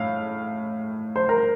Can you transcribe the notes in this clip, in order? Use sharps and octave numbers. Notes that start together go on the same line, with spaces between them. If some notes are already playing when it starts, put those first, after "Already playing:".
Already playing: A2 F5
C5
A#4